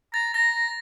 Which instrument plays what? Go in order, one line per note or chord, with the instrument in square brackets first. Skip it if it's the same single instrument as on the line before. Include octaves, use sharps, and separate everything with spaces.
[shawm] A#5 [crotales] A6
[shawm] A#5 [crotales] A#6